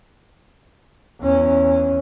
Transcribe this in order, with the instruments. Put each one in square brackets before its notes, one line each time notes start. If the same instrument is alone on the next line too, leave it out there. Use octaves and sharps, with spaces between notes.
[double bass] E2 C#4